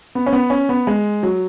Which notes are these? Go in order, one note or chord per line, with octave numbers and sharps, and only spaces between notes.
B3
C#4
B3
C#4
B3
G#3
F#3